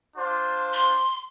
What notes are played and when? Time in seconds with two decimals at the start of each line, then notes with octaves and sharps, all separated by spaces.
0.17 D4 F4 C5
0.73 C6